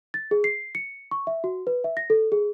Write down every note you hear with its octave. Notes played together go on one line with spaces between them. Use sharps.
A6
G#4
C7
C#7
C#6
E5
F#4
B4
E5
A#6
A4
G#4